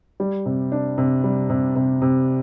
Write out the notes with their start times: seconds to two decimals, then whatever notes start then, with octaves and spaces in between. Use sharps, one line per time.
0.20 G3
0.46 C3
0.72 D4
0.98 C3
1.24 G3
1.50 C3
1.76 C3
2.02 C3